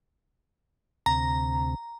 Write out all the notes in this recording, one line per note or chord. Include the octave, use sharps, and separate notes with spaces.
D2 C3 A#5